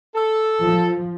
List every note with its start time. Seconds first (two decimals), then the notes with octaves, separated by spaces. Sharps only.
0.15 A4
0.60 F3